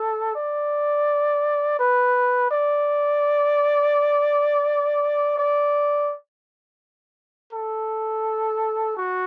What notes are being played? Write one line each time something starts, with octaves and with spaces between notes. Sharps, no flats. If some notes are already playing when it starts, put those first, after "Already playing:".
Already playing: A4
D5
B4
D5
D5
A4
F#4